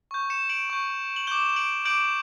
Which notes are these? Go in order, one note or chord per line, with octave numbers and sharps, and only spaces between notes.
C#6 G6
C#7 E7
D7 F#7
C#6 G6
F#7
D6 G6 E7 G7
D7 F#7
D6 G6 D7 F#7